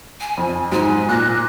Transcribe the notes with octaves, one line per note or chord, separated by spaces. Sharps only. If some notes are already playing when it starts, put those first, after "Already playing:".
G#5
F2
G#2 F#3 G#5
A#2 F#6 A#6